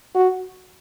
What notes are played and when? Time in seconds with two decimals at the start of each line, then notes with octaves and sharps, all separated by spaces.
0.15 F#4